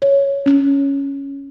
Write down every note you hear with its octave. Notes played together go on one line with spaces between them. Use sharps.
C#5
C#4